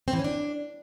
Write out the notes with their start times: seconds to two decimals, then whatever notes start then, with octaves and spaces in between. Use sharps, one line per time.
0.08 C4
0.13 E3
0.19 C#4
0.24 D4